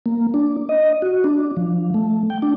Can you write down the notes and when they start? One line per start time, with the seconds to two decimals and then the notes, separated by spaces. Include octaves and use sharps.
0.06 A#3
0.34 D4
0.69 D#5
1.02 F#4
1.24 D4
1.57 F3
1.94 A3
2.30 G5
2.42 D4